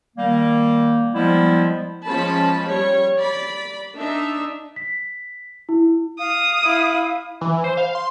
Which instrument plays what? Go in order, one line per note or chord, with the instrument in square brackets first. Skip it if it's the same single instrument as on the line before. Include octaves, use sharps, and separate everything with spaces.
[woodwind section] D#3 G3 A#3
F3 G3 G#3 B3 E4
[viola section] F3 G#3 C#4 A5 B5
G3 C#5
D5 B5
D4 D#4 E5
[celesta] B6
E4
[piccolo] F5 [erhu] D#6
[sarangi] E4
[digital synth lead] E3
C5
F5
C6